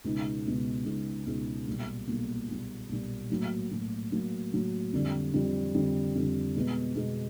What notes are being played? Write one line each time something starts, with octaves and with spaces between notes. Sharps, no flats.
C#2 B2 G#3 B3 D#4
C#2 B2 G#3 B3 D#4
C#2 B2 G#3 B3 D#4
C#2 B2 G#3 B3 D#4
B1 A#2 G3 A#3
B1 A#2 G3 A#3
B1 A#2 G3 A#3
B1 A#2 G3 A#3
A2 F#3 A#3
A2 F#3 A#3
A2 F#3 A#3
A2 F#3 A#3
F2 D3 G3
F2 D3 G3
F2 D3 G3
F2 D3 G3
B2 G#3 B3
B2 G#3 B3